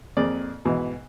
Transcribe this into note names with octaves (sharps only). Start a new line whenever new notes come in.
F2 A#3 C4 G#4 D5
G#2 B2 E3